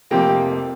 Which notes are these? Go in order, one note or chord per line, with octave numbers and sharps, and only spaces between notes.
F1 F2 C3 F3 A#3 G4